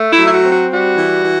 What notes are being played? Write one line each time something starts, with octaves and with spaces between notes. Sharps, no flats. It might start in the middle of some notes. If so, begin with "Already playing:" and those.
Already playing: A3
E4
F#3
E4
F#4
C4
F#4
G3 F#4
E3
E3